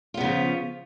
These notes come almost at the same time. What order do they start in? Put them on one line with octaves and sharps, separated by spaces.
F4 B3 C#3 F3